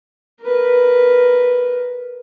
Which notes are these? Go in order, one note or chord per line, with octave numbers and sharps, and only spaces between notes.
A#4 B4